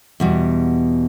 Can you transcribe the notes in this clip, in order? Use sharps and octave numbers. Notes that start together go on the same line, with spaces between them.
E2 B2 G3